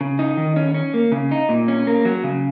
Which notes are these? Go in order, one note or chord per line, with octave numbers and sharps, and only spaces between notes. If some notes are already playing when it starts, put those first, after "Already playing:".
C#3
D#4
D#3
C#4
C#4
A#3
C#3
D#4
A#2
C#4
A#3
F#3
C#3